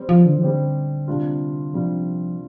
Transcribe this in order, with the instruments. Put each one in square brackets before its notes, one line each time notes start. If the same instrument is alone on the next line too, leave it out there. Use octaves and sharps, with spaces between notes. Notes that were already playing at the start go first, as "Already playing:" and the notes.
Already playing: [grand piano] G3 C4 G4 C5
[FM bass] F3
D3
F3
[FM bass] D3 [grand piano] G3 C4 G4 C5
[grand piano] C3 G3 D4 F4
[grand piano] C3 G3 D4 F4 [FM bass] F3